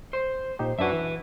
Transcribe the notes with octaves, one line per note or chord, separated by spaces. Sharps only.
C5
A#2 D#4 G4
F#2 D4 F#4 B4 E5
E3